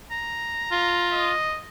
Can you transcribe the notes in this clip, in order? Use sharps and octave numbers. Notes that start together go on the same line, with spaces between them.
A#5
F4
D#5